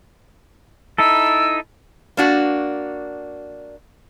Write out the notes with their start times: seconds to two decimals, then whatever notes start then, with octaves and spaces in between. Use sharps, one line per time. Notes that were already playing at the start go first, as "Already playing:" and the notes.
0.98 D#4 E4 A4 E6
2.17 A#3 D4 F#4